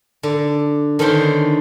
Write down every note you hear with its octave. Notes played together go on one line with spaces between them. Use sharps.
D3 D5
D3 D#3 B3 C#4 C5 C6